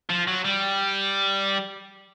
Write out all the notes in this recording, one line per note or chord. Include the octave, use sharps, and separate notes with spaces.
F3
F#3
G3